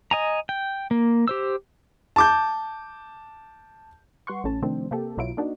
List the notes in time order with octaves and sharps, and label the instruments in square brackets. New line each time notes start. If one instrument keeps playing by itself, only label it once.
[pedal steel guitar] D#5 G#5 A#5
G5
A#3
G4 C5 E6
[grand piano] A5 D6 G6
[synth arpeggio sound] G3 B4 F#5 C6 C#6
A1 A2 C#4 A5
C3 D#3 F3 A3 C4 D4
C3 A#3 G4 A4
B1 B2 F#3 E4 F4 D7
A#3 D4 D#4 F#4